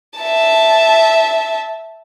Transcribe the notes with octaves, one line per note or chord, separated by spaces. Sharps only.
E5 A5